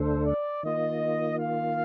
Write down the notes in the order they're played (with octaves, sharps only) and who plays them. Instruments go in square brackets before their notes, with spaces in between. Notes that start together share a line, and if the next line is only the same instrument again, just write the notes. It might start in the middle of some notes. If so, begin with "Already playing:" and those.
Already playing: [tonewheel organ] D2 D3 A3 D4 A4 [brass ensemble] C5
[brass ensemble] D5
[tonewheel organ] D#3 A#3 F4 [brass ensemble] D#5
[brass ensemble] F5